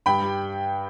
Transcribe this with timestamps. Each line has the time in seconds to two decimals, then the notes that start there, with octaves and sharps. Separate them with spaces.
0.06 G2 G5 B5
0.22 G3